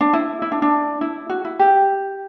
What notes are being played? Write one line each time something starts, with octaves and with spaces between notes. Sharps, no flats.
D4
E4
E4
D4
D4
E4
F#4
E4
G4